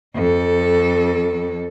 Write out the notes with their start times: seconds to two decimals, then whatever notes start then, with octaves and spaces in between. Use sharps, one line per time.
0.15 F2 A4